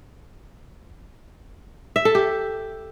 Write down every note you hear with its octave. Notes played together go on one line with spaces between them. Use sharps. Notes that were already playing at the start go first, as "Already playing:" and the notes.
E5
A4
G4